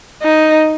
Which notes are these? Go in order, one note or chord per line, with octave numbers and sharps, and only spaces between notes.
D#4